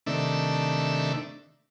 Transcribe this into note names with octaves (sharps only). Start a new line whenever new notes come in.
C3 D#3 A3 D4 E5